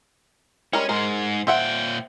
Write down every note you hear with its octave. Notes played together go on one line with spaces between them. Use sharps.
G3 G#3 C#4 A#4 C#5
G#2 G#3 A#4 C5
A#2 C5 E5 F#5 G5